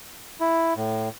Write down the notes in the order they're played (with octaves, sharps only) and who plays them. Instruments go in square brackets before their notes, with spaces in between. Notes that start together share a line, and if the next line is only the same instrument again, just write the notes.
[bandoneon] E4
A2